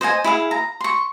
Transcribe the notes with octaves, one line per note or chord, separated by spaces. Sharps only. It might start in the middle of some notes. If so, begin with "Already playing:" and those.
C5 D#5 F#5 G#5
E4 G#4 F5
A#5
C6 C#6